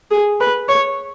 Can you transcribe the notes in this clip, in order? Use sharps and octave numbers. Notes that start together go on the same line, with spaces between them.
G#4
B4
C#5